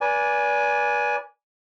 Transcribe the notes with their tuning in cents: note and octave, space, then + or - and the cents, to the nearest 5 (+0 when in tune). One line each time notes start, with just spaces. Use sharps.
B4 -35 D5 -20 G#5 +0